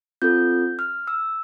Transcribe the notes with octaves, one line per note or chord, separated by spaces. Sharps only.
C4 F4 A4 G6
F6
E6